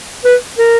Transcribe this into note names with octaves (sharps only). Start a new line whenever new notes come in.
B4
A#4